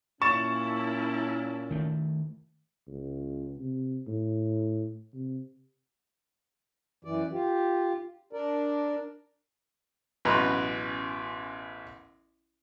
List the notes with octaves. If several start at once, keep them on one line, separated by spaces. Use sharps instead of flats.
A#2 A#3 C#4 E4 A5 C#6 A6 E7
D#3 A3
C#2
C3
A2
C3
F#2 E3 D5
F4 G4
D4 A#4 D5
A1 F#2 B2 B4 A#5 C6